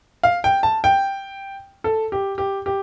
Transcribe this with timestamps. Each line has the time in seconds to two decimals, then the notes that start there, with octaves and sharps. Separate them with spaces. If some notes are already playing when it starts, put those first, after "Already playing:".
0.23 F5
0.44 G5
0.63 A5
0.84 G5
1.84 A4
2.12 G4
2.38 G4
2.66 G4